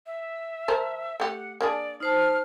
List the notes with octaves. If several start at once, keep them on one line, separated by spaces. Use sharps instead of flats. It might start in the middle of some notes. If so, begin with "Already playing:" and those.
E5
F3 A#4 C5
A3 G4 F#5
A#3 D4 G#4 D5
D#4 C5 A5 F6